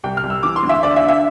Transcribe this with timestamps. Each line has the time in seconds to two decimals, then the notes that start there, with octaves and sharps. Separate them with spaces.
0.04 C2 G5
0.17 F6
0.23 C2
0.30 E6
0.43 E3 D6
0.56 C6
0.63 D2
0.69 E5
0.83 D3 D5
0.96 E5
1.02 D3
1.08 E5